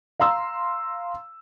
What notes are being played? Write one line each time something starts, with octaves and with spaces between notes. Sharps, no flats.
F5 A#5 C6 E6